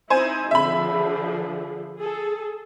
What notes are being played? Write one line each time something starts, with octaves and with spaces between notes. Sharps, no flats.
D#4 E4 C5 G#5
D3 F3 G#4 E5 B5
G#4 A4